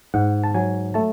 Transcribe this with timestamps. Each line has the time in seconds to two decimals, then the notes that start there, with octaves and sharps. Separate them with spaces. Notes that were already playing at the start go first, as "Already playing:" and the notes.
0.14 G#2 F#5
0.44 A5
0.54 F#3 G#5
0.94 A3 A5